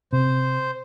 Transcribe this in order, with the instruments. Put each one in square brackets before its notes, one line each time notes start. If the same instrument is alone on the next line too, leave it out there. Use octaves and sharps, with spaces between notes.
[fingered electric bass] C3 [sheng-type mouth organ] C5